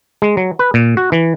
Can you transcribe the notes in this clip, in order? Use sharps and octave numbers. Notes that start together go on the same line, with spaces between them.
G#3
F#3
B4
A#2
F#4
E3